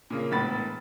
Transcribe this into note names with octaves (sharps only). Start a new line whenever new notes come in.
A#2 C#3 A#3
E1 A2 B3 B5 A6